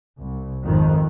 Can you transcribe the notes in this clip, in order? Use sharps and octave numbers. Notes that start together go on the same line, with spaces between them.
C2
G#1 F2 D#3